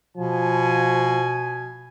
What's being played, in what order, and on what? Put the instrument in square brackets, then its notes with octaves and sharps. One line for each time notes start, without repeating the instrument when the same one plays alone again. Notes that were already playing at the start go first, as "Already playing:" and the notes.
[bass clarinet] B2 [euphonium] F3 [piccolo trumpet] G#5